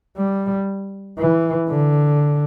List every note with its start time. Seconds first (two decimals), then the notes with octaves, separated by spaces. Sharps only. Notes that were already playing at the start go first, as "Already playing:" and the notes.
0.17 G3
1.18 E3
1.69 D3